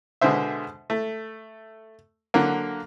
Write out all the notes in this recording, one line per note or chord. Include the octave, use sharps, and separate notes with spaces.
B2 D3 G#3 C5 E5
A3
D3 F#3 A#3